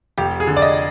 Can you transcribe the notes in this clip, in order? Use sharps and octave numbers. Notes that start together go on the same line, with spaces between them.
F1 G4
G#4
D3
D5
D#5